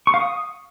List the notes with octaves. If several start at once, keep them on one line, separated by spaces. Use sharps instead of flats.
C#6
F5
D#6